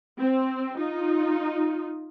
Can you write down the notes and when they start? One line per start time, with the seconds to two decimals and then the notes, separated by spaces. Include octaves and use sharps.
0.20 C4
0.78 D#4 F4